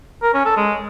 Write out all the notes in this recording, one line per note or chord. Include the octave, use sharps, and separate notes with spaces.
A#4
C#4
A4
G#3